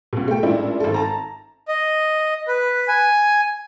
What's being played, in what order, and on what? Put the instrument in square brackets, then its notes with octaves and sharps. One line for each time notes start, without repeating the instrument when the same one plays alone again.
[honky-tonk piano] C#2 B2
A3 G5
A1 A#2 G#3 D4 E4
G#1 A4
A5 A#5
[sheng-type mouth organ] D#5
B4
G#5